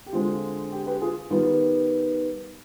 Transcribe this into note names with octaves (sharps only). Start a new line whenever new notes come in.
G4
D3 G#3 C4 F4
G4
G4 B4
F4 G#4
D#3 G3 B3 F4